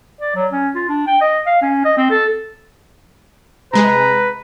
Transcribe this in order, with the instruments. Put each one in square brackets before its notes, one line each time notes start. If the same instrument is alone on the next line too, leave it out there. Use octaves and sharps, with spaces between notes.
[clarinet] D5
F#3
C#4
F4
D4
G5
D#5
F5
C#4
D#5
C4
A4
[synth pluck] C3 G#3 G#4 [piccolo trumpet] B4 [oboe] A#5